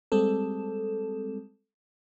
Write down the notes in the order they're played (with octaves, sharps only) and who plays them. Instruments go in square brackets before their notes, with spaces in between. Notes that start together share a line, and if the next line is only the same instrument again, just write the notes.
[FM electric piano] G3 G#3 C4 A4